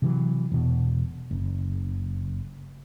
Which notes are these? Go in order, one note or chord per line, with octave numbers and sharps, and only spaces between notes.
C3 E3 F#3
E1 B2
F#1